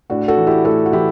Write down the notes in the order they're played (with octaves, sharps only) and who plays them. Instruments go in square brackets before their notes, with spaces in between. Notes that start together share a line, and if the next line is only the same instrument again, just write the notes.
[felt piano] A2 D4 F#4
F#4 A4
E3
E4 G4
A2 F#4 A4
F#4
E3 E4 G4